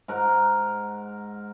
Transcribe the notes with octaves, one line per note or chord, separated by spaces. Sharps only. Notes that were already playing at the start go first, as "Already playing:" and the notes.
G#2 A#4 F#5